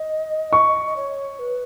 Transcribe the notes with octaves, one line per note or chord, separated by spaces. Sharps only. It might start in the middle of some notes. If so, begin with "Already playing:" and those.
Already playing: D#5
C#6
D#5
C#5
B4